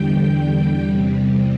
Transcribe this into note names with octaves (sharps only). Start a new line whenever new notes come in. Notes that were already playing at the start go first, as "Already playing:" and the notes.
Already playing: E2 D3 G3 G5
E2 C3 G3